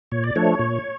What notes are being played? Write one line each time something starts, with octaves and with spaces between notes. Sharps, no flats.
A#2 C#5
D5
F3 A3 D4 C#5
A#2